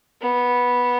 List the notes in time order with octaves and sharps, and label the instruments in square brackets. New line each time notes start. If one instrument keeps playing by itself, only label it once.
[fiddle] B3